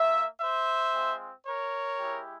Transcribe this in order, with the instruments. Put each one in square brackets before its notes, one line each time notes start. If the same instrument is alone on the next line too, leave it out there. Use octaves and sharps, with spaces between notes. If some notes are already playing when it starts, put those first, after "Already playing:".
Already playing: [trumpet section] A#3 F4 E5
C5 E5
G#3 C4 F4
A#4 C#5
G#3 E4 G4